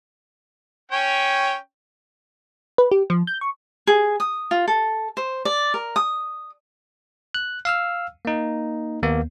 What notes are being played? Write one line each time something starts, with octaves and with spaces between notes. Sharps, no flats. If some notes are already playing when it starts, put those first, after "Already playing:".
C#4 C#5 G5
B4
G4
F3
G6
C#6
G#4
D#6
F4
A4
C5
D5
A#4
D#6
F#6
F5 E6 F6
A#3 D#4
D#2 A#3 B3